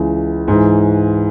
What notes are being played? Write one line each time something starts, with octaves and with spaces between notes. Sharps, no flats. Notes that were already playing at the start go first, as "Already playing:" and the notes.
Already playing: C#2 C#3 E3
G#2 E3